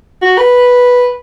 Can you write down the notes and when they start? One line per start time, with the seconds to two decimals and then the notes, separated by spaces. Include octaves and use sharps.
0.22 F#4
0.38 B4